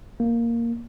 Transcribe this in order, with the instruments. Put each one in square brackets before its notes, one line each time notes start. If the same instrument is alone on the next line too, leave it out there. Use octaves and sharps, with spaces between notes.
[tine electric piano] A#3